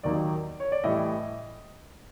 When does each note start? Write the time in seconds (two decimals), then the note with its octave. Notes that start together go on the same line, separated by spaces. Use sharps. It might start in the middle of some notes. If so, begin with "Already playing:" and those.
0.03 D#2 D#3 F#3 A#3 D#4 D5
0.60 C#5
0.72 D5
0.84 A2 E3 G3 D#5